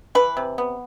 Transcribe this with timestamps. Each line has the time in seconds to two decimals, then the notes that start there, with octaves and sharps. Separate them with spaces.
0.15 E3 B4
0.37 C3
0.58 B3